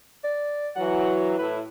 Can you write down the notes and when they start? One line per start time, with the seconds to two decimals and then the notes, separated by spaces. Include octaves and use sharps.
0.24 D5
0.76 E3 F#3 F#5
1.39 A2 E4 B4